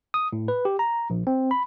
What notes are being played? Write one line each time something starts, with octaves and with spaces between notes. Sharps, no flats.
D#6
A2
B4
G4
A#5
A#1
C4
B5